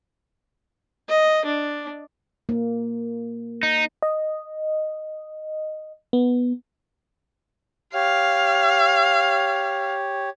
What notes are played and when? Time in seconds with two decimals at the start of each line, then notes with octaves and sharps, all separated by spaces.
1.09 D#5
1.45 D4
2.49 A#3
3.63 D#4
4.02 D#5
6.13 B3
7.94 G4 C#5 F5